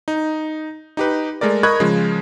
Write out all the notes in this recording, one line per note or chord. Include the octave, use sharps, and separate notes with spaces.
D#4
D#4 G4 B4
G#3 A3 A#4 D5
A#4 D#5 B5 C#6 F#6 G#6
C#3 F3 G#3